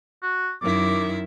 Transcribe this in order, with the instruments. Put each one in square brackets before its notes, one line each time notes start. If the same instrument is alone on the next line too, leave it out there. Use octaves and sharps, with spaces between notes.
[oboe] F#4
[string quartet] F#2 D#3 E4 [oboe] D6